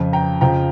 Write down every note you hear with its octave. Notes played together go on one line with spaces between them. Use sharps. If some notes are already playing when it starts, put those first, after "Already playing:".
Already playing: F2 C#3 F3
G5 A#5
F2 C#3 F3 G5 A#5